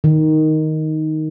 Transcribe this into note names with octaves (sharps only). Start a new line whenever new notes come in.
D#3